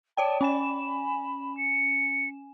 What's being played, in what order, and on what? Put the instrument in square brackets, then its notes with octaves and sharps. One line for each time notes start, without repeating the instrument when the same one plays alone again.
[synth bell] C#5 D5 G5 [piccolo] A5
[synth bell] C#4 G#5 E7 [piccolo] B5
[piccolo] C#7